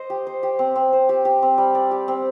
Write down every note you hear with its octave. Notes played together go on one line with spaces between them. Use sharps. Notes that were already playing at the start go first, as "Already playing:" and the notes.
Already playing: C5 D#5
G4
C5
G4
C4
C4
C5
G4
G4
C4
G3
D5
G4
C4